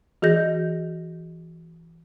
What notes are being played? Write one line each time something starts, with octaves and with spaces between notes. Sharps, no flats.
E3 F#4 G#4 D#5 G6 A#6